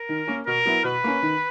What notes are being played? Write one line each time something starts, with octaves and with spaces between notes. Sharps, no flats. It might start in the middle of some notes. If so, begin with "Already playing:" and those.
Already playing: A#4
D#3
A#3 C#4
B2 A#4
F#3 B3 E4
B2 B4
A#3 C#4
D#3